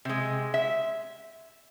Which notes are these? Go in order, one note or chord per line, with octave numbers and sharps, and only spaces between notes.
C3 G#3
E5